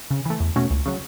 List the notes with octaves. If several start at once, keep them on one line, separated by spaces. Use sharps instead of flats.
C#3
E3 A3
E2
B2 A3 C#4 F#4
C#2
C#3 F#3